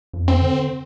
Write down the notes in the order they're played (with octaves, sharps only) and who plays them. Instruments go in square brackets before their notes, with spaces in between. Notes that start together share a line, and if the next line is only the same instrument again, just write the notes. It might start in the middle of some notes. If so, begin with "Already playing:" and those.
[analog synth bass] F2
[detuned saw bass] C4
[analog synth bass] D3